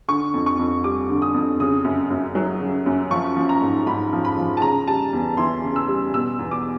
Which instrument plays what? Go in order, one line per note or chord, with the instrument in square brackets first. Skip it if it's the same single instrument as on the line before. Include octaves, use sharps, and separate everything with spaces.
[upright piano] D3 C#6
F2
C#6
F2
G3 D6
D3
D#6
F2
C#3 D#6
F#2
F#2
F#3
C#3
F#2
F3 C#6
F3
A#5
G#2
G#2 B5
F3
B5
F3
A5
C#3 A#5
G3 A5
E2
E3 C6
C#3
E6
G3
B2 E6
E2
D6